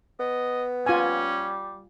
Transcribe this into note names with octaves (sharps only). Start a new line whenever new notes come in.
B3 D#5
G3 C#4 F4 G#5